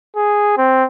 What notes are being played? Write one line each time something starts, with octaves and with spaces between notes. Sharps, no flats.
G#4
C4